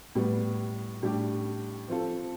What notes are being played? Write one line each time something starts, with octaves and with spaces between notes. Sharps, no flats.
A2 G3 B3
A2 G3 D4 G4
F3 C4 F4 A4